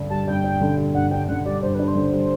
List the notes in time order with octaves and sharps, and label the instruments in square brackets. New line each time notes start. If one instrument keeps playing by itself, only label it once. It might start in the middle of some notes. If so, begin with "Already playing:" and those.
Already playing: [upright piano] G2 D3 D4
[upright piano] G3 [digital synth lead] A5
[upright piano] G2 [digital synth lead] G5
[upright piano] D4
D3
G3
[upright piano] G2 [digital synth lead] F#5
[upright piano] D4 [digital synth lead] G5
[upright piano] D3 [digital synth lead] F#5
[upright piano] G3 [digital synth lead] D5
[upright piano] G2 [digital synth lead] C5
[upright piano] D4 [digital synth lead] B4
[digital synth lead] C5
[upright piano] D3
G3